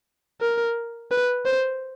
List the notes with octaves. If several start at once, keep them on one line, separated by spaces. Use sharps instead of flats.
A#4
B4
C5